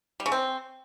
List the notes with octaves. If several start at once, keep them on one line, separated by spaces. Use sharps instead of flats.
G3
C#3
C4